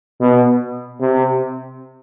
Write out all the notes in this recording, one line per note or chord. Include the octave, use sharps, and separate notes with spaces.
B2
C3